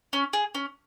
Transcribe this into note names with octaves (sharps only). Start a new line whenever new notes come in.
C#4
G#4
C#4